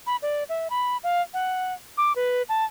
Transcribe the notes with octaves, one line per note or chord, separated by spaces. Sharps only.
B5
D5
E5
B5
F5
F#5
D6
B4
A5